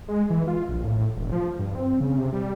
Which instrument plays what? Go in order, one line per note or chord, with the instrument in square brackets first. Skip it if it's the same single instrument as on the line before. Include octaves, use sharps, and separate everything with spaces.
[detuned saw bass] G#3
E3
F4
A#1
A2
E1
F3
G2
C4
C#3
C3
G3